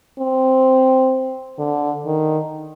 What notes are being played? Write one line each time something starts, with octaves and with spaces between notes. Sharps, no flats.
C4
D3
D#3